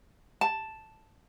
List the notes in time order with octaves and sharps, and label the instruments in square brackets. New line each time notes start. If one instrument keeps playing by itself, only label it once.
[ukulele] A5